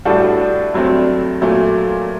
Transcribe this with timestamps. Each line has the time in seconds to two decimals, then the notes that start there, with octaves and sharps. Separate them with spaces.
0.05 A2 G3 D4 F#4 A4
0.74 G2 F#3 A3 C4
1.42 A#2 F#3 A3